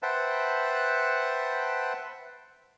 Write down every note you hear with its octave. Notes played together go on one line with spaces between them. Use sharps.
B4 C5 E5 F#5 G5 A5